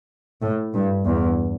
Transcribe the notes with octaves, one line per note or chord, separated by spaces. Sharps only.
A2
G2
E2